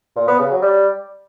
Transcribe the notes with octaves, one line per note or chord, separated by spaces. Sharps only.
A#2
B3
C#3
F#3
G3